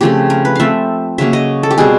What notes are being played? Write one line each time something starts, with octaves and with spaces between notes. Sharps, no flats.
C#3 F3 A3 C4 G4
A#4
B4
F3 A3 C4 E5 F5
C#3 F#3 A#3 E5
D#5
A4
G4
B2 G3 C4 G#4